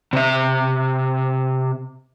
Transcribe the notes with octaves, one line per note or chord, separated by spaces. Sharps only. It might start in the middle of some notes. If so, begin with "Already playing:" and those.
C3 E5